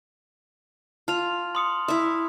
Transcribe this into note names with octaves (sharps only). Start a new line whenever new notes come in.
F4 A5 F6 F7
C6 D#6 C#7
E4 E5